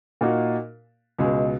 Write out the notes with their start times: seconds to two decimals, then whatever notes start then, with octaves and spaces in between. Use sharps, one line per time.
0.21 A#2 A#3 D#4 F#4
1.19 C#2 B2 G#3